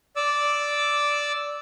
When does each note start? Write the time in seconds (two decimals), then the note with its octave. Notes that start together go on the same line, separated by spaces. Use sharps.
0.16 D5 D6 E6